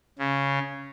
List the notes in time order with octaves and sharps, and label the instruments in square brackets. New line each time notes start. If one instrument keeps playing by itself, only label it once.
[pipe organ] C#3